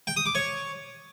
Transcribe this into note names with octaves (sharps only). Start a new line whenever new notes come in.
G5
D#6
D6
C#5